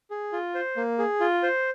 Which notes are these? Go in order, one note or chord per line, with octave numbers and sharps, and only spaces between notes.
G#4
F4
C5
A#3
G#4
F4
C5